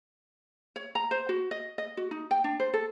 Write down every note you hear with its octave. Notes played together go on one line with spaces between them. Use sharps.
C#5
A#5
C5
F#4
D#5
D#5
F#4
D#4
G5
D4
C5
A4